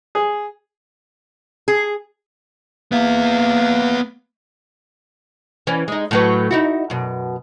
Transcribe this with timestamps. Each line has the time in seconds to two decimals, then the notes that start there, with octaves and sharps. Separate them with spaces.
0.15 G#4
1.68 G#4
2.92 A#3 B3 E5
5.67 E3 C#4
5.88 G#3 D#4
6.11 A2 F#3 B4
6.51 D#4 E4 F#4
6.90 F#2 B2